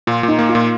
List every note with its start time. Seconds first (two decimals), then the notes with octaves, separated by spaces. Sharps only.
0.07 A#2 F4
0.23 A#2
0.28 D#4
0.39 A#3
0.50 F4
0.55 A#2